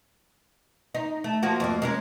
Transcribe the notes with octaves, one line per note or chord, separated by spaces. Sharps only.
D#4
A3
F3 A#3 F#4
F2 G#2 A#3
G#3 C#4 A#4